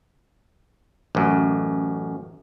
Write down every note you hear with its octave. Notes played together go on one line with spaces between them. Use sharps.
A1 F#2